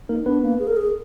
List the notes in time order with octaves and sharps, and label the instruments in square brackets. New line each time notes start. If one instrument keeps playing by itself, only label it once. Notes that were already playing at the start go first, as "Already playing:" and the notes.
[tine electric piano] A#3 A#4 [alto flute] D#4
[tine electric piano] B3 B4 [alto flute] D4
[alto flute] A#3
G#4
A#4
G#4